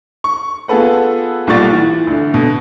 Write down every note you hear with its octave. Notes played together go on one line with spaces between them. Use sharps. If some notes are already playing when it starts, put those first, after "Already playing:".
C#6
B3 F4 G#4 A4 B4 F#5
B1 A#2 G3 F#5 C#6 A6
E3
D2 D3
B2 D3